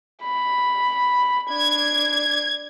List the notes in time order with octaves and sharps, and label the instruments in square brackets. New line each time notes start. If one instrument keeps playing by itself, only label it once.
[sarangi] B5
[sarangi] D4 [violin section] G#6